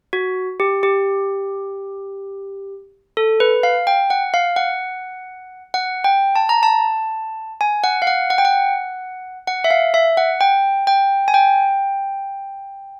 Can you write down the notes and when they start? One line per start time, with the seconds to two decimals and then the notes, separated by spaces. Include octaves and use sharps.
0.13 F#4
0.60 G4
0.83 G4
3.17 A4
3.40 B4
3.63 F5
3.87 G5
4.10 F#5
4.34 F5
4.56 F#5
5.74 F#5
6.04 G5
6.36 A5
6.49 A#5
6.63 A5
7.61 G#5
7.84 F#5
8.02 F5
8.07 F#5
8.30 F#5
8.38 G5
8.45 F#5
9.47 F#5
9.64 E5
9.71 F5
9.94 E5
10.17 F#5
10.41 G5
10.87 G5
11.28 G#5
11.34 G5